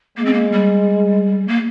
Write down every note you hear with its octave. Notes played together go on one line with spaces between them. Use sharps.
G#3 A#3
C4
A#3
G3
A#3